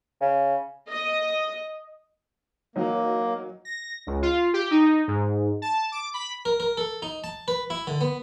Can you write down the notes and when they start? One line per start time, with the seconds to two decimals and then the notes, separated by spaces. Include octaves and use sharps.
0.21 C#3
0.90 D#5
2.76 E3 F#3 A#3 D#4
3.65 A#6
4.07 C#2
4.22 F4
4.53 G4
4.71 D#4
5.08 G#2
5.62 A5
5.92 D6
6.14 B5
6.45 A#4
6.60 A#4
6.78 A4
7.02 D#4
7.24 A5
7.48 B4
7.70 E4
7.87 D3
8.01 B3